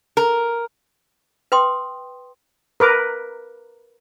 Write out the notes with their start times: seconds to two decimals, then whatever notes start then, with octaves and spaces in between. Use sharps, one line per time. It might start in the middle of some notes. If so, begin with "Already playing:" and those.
0.17 A#4
1.52 B4 G5 C6 D#6
2.80 A#4 B4 D6